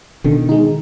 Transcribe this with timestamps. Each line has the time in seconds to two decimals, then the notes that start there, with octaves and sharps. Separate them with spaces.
0.24 B2 D3 D#3
0.49 G#3 D#4